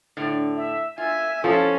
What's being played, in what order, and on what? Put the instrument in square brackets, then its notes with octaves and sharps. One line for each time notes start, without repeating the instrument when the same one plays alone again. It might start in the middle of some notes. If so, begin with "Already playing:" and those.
[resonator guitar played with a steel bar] A2 D3
[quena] E5
[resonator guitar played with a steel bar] F4 [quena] E5 [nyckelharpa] G#5
[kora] F3 [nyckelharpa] C#4 [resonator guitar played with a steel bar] A4